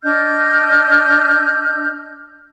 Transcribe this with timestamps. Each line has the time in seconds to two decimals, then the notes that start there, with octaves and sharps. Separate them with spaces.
0.02 D4 D#5 F6 G6